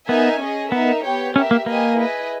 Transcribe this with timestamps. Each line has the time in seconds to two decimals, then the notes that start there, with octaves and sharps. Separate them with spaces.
0.09 B3 D#4 A#4 E5 G#5
0.41 C#4 G#4 D#5
0.72 B3 D#4 A#4 E5
1.04 B3 G4 C#5 G5
1.35 C#4 G4 A#4 E5
1.51 A#3
1.66 A#3 G4 B4 D#5 G#5
1.98 E4 G#4 B4 D#5